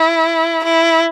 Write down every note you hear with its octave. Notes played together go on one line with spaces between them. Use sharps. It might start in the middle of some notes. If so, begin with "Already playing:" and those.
Already playing: E4
E4